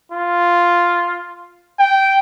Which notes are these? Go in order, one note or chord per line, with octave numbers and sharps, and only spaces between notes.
F4
G5